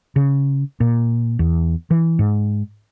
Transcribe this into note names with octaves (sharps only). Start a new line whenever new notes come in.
C#3
A#2
E2
E3
G#2